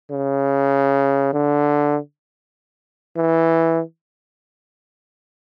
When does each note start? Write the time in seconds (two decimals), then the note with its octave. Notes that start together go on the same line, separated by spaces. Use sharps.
0.11 C#3
1.33 D3
3.17 E3